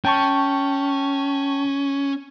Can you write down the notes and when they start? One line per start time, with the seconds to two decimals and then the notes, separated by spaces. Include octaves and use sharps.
0.05 C#4 G5 A5 C#6